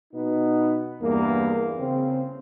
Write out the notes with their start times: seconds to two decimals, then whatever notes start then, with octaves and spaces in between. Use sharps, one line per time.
0.14 B2 B3 D#4
1.01 E2 G2 A#3
1.79 C#3 C4